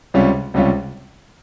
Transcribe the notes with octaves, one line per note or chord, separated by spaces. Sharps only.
C#2 C3 G3 C#4 F4
C#2 C3 G3 C#4 F4